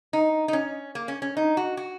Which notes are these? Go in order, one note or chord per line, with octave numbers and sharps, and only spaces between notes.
D#4
D#4
C#4
A#3
C#4
C#4
D#4
F#4
F#4